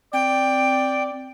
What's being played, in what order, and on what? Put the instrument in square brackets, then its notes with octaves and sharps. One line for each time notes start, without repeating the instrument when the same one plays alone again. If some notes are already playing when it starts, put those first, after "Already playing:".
[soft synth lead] C4 [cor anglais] D5 [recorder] G5